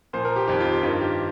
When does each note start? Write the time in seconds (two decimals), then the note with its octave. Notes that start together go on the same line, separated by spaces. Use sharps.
0.13 A#2 F3 C5
0.25 A#4
0.36 G4
0.48 F2 D#3 G4
0.60 F4
0.72 G4
0.83 G2 D#3 F4
1.01 G4